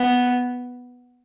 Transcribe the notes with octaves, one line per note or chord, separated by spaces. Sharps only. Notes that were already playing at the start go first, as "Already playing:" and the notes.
Already playing: B3